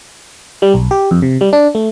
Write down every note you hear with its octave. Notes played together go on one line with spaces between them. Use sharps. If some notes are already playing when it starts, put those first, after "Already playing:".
G3
B1
G4
F2
C3
G3
D4
A3